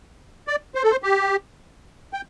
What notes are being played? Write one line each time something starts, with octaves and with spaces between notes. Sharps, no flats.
D5
C5
A4
C5
G4
G5